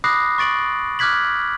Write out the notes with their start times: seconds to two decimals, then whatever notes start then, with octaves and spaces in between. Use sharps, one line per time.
0.04 B5 D6 D#6 F#6 A#6 C7
0.38 C#6 A6 D7 F#7
0.99 D6 F6 F#6 G#6 B6 F#7